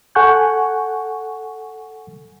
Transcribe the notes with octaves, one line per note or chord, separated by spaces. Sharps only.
A4 F#5 G#5 C#6 F#6 G6